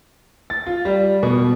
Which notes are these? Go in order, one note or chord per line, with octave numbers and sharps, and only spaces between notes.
A6
F4
G3
B2